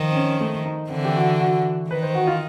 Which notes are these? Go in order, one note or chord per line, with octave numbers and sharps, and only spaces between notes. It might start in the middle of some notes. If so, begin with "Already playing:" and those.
Already playing: D#3 F3
C4
C#4
A3
D#4
D3 E3 C4
G4
F#4
F#4
D#3 B4
C5
F#4
F4